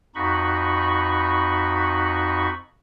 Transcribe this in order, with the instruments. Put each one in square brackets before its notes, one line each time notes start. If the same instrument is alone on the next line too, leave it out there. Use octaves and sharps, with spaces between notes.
[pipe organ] F2 D#4 F#4 B5 C#6